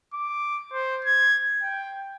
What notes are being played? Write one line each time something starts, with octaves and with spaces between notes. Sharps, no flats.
D6
C5
G#6
G5